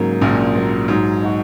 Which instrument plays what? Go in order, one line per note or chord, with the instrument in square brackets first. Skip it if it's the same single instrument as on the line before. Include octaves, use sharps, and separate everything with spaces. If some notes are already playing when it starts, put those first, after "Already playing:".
Already playing: [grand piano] G#2 [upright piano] C#3 F#3 A#3
[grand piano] A#1 A#2 [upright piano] C#3
[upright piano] F#3 A#3
[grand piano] G#2 [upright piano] F#3
[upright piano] D#4 F#4